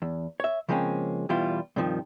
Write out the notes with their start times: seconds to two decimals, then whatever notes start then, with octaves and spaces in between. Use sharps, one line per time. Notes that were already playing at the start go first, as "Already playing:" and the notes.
0.02 E2
0.40 C#5 E5
0.69 C#3 F3 G#3 A#3 C4 C#4
1.29 E2 B2 E3 G3 E4 F4
1.76 G2 C3 D#3 F3